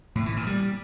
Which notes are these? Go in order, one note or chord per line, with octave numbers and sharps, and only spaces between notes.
A2
E3
A#2
G3